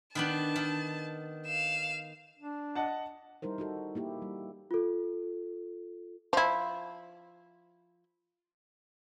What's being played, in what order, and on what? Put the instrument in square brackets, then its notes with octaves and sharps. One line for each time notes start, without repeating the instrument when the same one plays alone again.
[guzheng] D#3 B3 D4 [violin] A5
[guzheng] D#3
[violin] F5 E7
[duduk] D4
[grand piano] D#5 F#5 A5
[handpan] G3 D#4 E4 A#4 C5
D#4 F#4 A4
A#3 E4 G4
G3
[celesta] F4 A4
[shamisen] F3 E4